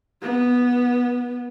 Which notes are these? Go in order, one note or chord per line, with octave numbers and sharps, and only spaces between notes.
B3